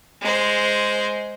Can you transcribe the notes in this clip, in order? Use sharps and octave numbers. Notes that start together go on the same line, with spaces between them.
G#3 C5